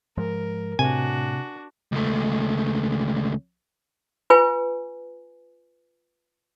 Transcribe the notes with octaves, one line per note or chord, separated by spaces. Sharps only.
G#2 F3 G#3 A#4
A2 C3 D4 F#4 G#5
C#2 A3
F4 B4 G#5